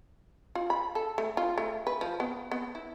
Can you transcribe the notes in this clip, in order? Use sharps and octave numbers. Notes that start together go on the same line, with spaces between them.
F4
B5
A4
A3
F4
A3
B4
F3
B3
B3
E4